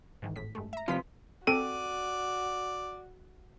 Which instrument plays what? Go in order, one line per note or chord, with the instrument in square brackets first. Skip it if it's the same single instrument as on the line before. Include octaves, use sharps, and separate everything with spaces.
[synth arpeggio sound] G#2 D#3 E3
G#1 A2 B6
G2 G#3 A3
E5 A#5
[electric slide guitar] C3 F3 F4 [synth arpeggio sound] B4 D#6 B6
[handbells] C4 A4 D7 [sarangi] F#4 [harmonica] D5 [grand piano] D#7